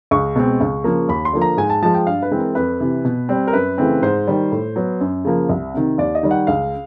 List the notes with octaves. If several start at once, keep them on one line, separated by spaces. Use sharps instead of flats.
C#2 C#6
B2 G#3 C4
C#2
C#3 F3 A#3
D#2 B5
C6
D3 F3 A#3
A#5
G#2 G#5
A5
F3 G#3 A5
G5
G2 F5
B4
E3 G#3 C4
A#4
F2 B4
C3 E3
B2
G3 C4
A#4
F#2 B4
C#3 E3 A3 C4
G#2 C5
D#3 G3
A2
F#3 B3
F#2
C#3 F3 A#3
C2
C3 D#3
D#2 D5
D#5
D#3 G3
F#5
C#2 F5